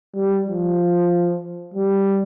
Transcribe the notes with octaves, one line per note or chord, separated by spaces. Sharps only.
G3
F3
G3